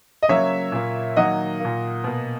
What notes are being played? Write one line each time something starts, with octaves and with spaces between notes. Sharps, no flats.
D#5
C#3 F#3 A#3 C#5 E5
A#2 A#3
D#3 F#3 A#3 D#5 F#5
A#2 A#3
B2 A#3